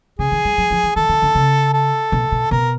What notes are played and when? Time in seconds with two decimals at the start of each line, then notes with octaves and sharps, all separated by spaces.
0.19 C#3 G#4
0.32 D#3
0.45 G3
0.58 F#3
0.71 F3
0.83 E3
0.96 D#3 A4
1.09 D3
1.22 D3
1.35 C#3
1.73 A4
2.12 B2
2.32 B2
2.51 B2 A#4